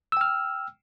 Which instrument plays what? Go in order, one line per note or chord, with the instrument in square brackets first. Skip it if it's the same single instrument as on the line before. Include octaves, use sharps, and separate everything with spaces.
[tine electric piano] E6
G5
F6